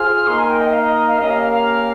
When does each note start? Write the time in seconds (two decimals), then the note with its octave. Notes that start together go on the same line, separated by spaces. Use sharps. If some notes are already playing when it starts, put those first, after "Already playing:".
Already playing: F4 G#4 C5 F6
0.26 A#3 D#4 A#4 C6
0.39 G#5
0.49 G5
0.61 D#5
0.73 F5
0.84 D#5
1.08 F5
1.19 A#3 C#4 G4 A#4 D#5
1.30 F5
1.42 F5
1.53 F5